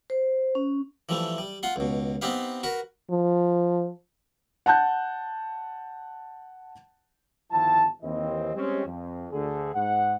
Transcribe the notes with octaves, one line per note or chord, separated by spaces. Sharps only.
C5
C#4
E3 F3 G3 A3
G3
F4 F#5 C6
C#2 B2
B3 C4 D#4 G4 B4 F5
F#4 A#4 B4
F3
F#5 A5 F#6 G6
G1 D#3 F3 E4 A5
D#2 E3 C4 D#5
G3 G#3 C4 C#4
F2
D2 D3 G#4
G#2 F#5